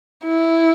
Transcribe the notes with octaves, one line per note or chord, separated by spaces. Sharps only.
E4